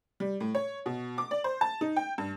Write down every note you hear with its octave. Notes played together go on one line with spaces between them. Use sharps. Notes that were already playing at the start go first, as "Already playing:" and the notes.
G3
A2
C#5
B2
D6
D5
C5
A5
D#4
G5
G2